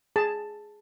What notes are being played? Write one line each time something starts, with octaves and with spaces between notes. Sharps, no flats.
G#4 A5